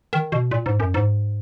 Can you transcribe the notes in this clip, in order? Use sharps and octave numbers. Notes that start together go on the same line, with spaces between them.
D#3
B2
A#2
G#2
F#2
G#2